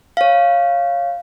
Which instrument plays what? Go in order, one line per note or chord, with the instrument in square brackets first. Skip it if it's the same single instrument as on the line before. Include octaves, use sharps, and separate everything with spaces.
[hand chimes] C#5 F5